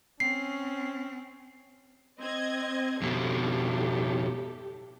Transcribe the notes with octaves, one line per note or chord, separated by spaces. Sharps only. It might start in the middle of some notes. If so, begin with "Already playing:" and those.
C4 C#4 C7
C4 D#5 G#6
F2 B2 G4 A4